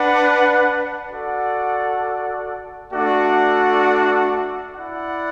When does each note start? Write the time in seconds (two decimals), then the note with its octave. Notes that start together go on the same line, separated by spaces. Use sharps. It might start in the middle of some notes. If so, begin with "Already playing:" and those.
Already playing: D4 B4 F#5
1.11 F#4 A4 D5 F#5
2.93 A3 D4 F#4 D5 F#5
4.75 E4 D5 F#5